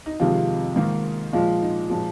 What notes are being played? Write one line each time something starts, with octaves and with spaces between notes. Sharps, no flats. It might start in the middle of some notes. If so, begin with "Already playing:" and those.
D#4
F2 C3 D#3 G#3 F4
G#2 D#3 A#3
A#2 F3 G#3 F4
D#4
A#2 F3 G#3